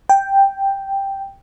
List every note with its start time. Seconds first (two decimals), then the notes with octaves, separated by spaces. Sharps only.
0.09 G5